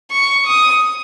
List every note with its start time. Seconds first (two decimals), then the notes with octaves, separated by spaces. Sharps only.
0.11 C#6
0.47 D#6